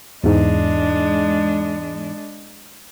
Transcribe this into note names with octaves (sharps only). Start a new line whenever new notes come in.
E2 G#2 G#3 D4